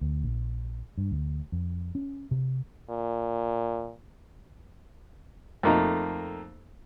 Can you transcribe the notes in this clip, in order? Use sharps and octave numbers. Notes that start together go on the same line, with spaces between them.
D2
A#1
G2
D2
F2
C#4
C3
A#2
F2 A3 A#3 D#4 A#5